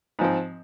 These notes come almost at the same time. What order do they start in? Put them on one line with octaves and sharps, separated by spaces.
G#2 F3 C4